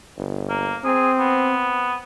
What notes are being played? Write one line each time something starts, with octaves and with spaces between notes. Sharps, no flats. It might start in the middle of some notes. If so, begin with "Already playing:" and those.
G1
A#3
C4 G#4
B3